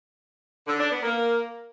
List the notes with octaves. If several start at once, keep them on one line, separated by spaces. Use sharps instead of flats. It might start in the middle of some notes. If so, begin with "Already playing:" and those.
D3
D4
B3
A#3